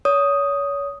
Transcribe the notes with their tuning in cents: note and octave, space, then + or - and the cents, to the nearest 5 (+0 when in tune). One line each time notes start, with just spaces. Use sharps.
C#5 +30 D#6 +0